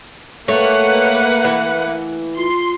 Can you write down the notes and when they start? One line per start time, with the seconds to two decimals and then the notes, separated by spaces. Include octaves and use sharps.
0.48 A3 A#3 B4 C#5 E5 F#5
1.44 E3
2.36 F4 C6